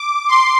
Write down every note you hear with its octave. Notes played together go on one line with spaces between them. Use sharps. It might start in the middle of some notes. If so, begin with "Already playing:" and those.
Already playing: D6
C6